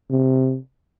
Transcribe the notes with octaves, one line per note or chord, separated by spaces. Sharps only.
C3